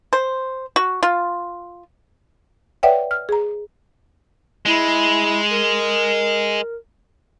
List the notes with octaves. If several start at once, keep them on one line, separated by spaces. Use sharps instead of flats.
C5
F#4
F4
B4 C#5 D5 E5 F#5 G5
F6
G#4 A#5
G#3 E4
A#4